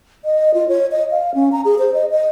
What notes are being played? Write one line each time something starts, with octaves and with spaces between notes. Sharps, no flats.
D#5
F4
C#5
D#5
F5
C#4
A#5
G#4
C5
D#5
D#5